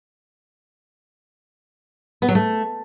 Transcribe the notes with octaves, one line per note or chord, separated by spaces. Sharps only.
B3
F#3
A3